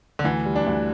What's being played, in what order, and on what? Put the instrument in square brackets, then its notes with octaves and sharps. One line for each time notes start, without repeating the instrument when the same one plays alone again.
[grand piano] D3
[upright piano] D2 [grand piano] E3
[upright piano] G3
[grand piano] D4
[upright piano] D2